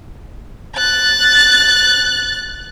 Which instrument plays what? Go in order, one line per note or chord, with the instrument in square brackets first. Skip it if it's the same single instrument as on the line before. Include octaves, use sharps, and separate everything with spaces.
[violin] F#6 A6